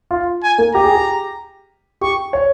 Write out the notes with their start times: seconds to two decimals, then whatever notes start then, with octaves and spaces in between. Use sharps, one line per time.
0.11 F4
0.43 G#5
0.58 A#3
0.74 G4 A#5
0.84 G#4
0.95 G4
2.01 G4 C#6
2.33 C#5